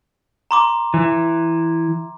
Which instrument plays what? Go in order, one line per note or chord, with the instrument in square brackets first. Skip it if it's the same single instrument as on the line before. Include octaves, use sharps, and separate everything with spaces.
[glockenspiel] A#5 C6 D6
[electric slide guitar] E3